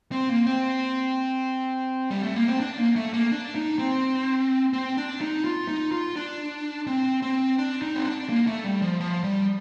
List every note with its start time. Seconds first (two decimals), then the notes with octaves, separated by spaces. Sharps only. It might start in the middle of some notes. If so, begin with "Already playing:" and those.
0.12 C4
0.29 A#3
0.46 C4
2.10 G3
2.24 A3
2.35 A#3
2.48 C4
2.60 D4
2.78 A#3
2.96 A3
3.13 A#3
3.31 D4
3.55 D#4
3.79 C4
4.73 C4
4.97 D4
5.21 D#4
5.44 F4
5.68 D#4
5.92 F4
6.16 D4
6.87 C4
7.22 C4
7.58 D4
7.82 D#4
7.95 C4
8.05 D4
8.29 A#3
8.47 A3
8.64 G3
8.82 F3
9.00 F3
9.24 G3